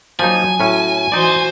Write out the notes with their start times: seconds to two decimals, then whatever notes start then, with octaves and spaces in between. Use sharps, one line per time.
0.19 F3 F#3 A#3 D#4 G#5
0.60 A2 C#4 F#4
1.12 E3 D#4 F#4 C5 D5